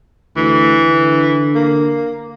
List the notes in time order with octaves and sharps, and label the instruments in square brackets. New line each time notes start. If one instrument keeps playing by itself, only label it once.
[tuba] D2 [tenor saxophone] E3
[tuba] D3
[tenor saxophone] A#3